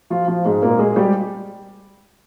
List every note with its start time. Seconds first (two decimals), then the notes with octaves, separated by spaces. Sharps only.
0.10 F3 F4
0.27 F3 F4
0.45 G#2 G#3
0.62 A#2 A#3
0.79 G#3 G#4
0.96 G3 G4